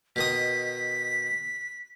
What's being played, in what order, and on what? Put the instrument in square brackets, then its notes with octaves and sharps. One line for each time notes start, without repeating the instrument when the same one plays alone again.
[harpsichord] B2 D#3 D#6 [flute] B6